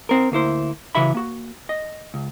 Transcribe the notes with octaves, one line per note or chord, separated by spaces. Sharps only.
C4 A#4
D2 A#3 E4 C5
C#3 E3 F#4 E5 B5
A#3 F#4
D#5
C#2